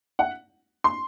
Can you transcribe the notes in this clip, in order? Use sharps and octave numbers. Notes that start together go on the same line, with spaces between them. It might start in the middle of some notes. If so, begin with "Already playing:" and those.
F#5
C6